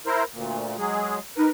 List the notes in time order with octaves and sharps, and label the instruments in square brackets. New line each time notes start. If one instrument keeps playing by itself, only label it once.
[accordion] E4 A#4 C5
D2 A#2
F#3 G#3 G#4
[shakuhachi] D#4 [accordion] A#4 B4